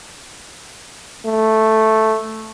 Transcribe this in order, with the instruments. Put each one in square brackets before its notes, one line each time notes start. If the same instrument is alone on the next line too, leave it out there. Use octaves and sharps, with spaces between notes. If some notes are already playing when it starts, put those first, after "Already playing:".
[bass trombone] A3